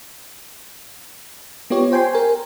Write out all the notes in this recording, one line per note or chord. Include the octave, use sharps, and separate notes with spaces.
B3 F4 G4 C#5
C5 G5 G#5 C6
A#4 G#5